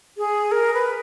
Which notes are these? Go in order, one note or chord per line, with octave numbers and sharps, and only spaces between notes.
G#4
A#4
B4